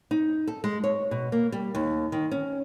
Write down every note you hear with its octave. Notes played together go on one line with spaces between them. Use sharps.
D#4
A4
G#3
C#5
B2
A#3
G3
D#2
D#3
C#4